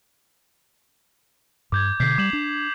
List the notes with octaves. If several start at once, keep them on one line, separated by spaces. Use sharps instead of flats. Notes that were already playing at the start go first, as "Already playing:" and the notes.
G2 D6 G6 G#6
B2 D3 G6 B6 C7
G3 D6 E7 F#7
D4